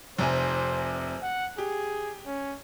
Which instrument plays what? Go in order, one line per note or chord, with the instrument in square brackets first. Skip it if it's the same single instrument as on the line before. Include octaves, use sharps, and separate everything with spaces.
[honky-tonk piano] F1 C3 G#5 [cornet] C5
[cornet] F#5
[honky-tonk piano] G4 [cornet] G#4
[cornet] C#4